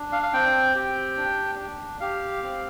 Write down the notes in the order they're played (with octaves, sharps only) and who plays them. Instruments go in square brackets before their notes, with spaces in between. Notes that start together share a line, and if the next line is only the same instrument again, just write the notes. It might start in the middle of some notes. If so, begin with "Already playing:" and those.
Already playing: [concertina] D4
F5
F5
C4 G5
G4
D4
D4
G4 F5
C4